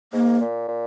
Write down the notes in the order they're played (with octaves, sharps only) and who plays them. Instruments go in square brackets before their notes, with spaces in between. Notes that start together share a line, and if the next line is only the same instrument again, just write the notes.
[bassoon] G#2 [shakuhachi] A#3
[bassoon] A#2
A#2